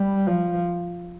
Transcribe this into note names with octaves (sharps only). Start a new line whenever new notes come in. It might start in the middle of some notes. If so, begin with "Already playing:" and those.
Already playing: G3
F3